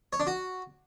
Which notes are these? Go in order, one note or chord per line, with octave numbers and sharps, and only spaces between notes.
C#5
D4
F#4